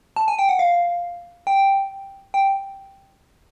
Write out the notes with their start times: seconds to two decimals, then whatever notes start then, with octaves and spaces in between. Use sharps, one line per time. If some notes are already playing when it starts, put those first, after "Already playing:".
0.16 A5
0.28 G#5
0.39 G5
0.49 F#5
0.59 F5
1.47 G5
2.34 G5